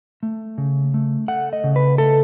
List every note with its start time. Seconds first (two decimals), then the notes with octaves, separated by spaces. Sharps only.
0.23 A3
0.58 C#3
0.94 A3
1.28 A3 F#5
1.53 D#5
1.64 C#3
1.76 B4
1.98 A3 A4